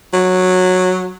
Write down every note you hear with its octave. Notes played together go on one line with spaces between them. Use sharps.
F#3